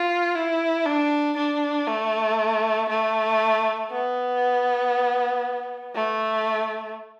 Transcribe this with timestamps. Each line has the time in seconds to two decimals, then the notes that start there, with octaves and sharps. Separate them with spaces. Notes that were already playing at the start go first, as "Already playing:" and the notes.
Already playing: F4
0.35 E4
0.86 D4
1.37 D4
1.87 A3
2.89 A3
3.90 B3
5.95 A3